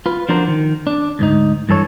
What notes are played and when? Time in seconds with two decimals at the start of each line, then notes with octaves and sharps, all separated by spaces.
0.06 F4 B4
0.29 F3 D4 F#4 A#4 C5
0.48 D#3
0.87 D4
1.19 D2 G#2 D#4
1.69 G2 E3 A4 C#5